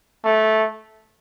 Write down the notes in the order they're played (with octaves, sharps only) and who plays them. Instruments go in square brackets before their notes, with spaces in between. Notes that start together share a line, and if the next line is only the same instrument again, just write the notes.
[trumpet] A3